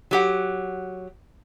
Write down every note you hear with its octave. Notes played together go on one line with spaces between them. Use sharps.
F#3 G4 F#5